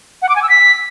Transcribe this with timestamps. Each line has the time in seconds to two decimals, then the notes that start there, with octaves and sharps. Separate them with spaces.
0.22 F#5
0.29 D6
0.36 G#5
0.43 E6
0.49 B6